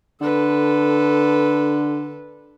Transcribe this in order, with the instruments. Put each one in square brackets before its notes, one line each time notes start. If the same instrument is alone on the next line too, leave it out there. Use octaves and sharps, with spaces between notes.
[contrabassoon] D3 [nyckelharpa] A4 B4